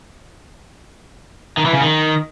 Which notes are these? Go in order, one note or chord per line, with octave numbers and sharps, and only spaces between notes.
D#3
E3
C#3
D#3